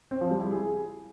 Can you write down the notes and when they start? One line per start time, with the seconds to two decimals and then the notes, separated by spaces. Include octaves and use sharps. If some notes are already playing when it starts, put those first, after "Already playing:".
0.11 C4
0.21 F3
0.31 G3
0.41 E4
0.51 G#4